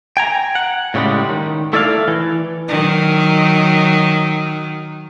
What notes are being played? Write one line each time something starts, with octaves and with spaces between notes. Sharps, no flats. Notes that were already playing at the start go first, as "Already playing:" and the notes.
G5 G#5 A#5
F#5
A2 C#3 E3 G3 G#3
D#3
A3 E4 A4 D5 D#5 F5
E3
D#3 F#3